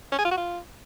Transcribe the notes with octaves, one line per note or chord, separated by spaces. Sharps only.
C#4
G#4
F4
F#4
F4